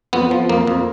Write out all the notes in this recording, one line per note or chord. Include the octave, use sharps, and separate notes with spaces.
F2 B3
F3
F2 A#3
F2